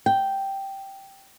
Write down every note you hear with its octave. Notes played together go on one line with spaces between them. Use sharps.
G5